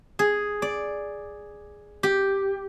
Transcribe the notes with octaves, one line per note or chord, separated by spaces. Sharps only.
G#4
D5
G4